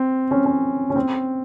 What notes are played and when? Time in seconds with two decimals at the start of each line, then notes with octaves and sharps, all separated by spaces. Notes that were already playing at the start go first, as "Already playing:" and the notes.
Already playing: C4
0.31 C#4
0.45 C#4
0.90 C#4
0.96 C4